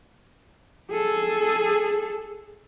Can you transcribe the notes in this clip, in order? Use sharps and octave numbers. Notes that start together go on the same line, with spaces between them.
G#4 A4